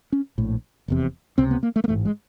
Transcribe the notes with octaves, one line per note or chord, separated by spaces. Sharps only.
C#4
A#1 A2
F1 E2 C3
C#2 C3 C4
B3
A#3
A3
A#3
A1 G#2 A3
G#3